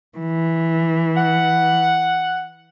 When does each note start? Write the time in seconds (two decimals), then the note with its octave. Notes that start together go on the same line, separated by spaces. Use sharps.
0.18 E3
1.17 F#5